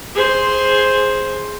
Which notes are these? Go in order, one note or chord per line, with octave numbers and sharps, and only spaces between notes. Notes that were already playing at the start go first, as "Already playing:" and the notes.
G#4 C5